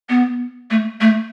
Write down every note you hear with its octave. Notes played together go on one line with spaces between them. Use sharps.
B3
A3
A3